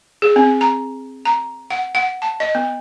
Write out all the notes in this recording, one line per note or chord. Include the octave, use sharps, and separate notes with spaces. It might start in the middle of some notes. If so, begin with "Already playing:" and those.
G#4
C4
A#5
A#5
F#5
F#5
A5
D#5
B3